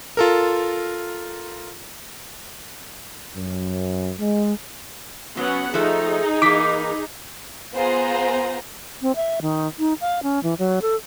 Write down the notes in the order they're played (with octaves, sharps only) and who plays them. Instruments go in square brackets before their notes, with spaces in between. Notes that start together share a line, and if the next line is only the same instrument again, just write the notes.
[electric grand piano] F4 A4 A#4
[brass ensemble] F#2
G#3
[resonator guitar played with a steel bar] F#3 [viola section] B3 C#4 F#5
[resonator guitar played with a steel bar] F3 A3 [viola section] D#4 G#4
[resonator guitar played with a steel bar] E3 A#3 [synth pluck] D6 B6
[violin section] B3 F4 G#4 C5 A#5
[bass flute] C4
E5
D#3
D#4
F5
C#4
E3
F#3
A4